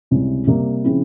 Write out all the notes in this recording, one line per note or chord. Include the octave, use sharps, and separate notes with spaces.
C#2 C3 G3 C#4 E4
C3 G3 A#3
C#3 F3 C4 E4